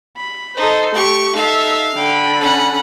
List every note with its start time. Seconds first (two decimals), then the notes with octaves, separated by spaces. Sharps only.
0.17 B5
0.57 D#4 A4 C5
0.95 A3 G4 C#6
1.35 D#4 A4 E5 F5
1.96 D3 G5 B5
2.41 C#4 F#5